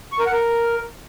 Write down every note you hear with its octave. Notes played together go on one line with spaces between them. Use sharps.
C#6
A#4
F#5
A#4